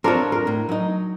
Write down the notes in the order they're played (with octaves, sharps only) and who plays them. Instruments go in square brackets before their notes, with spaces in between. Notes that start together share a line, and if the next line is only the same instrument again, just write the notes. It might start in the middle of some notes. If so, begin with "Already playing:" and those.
[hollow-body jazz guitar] C4 F4 C#5 [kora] D4 A#4
[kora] A#4
[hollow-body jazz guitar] A2
F#3 D#4